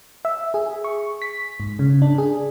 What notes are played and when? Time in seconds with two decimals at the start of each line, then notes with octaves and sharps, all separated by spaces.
0.25 E5
0.54 G#4
0.84 C#6
1.22 B6
1.60 G#2
1.79 C#3
2.02 D4
2.18 G#4